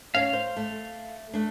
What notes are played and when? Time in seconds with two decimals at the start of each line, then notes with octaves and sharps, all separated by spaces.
0.15 C#4 C#5 F5
0.33 C5
0.56 A3
1.33 A3 D4